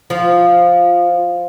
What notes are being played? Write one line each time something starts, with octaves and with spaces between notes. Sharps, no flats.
F3